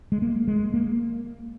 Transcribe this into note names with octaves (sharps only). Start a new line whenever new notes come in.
G#3
A#3
G#3
A#3